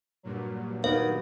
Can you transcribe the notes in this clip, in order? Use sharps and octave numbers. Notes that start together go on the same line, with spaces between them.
G2 A#2 F#3
D#3 B3 F5